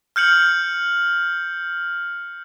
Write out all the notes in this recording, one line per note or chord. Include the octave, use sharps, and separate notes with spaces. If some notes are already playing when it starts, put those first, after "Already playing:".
F6 G6 C#7 F#7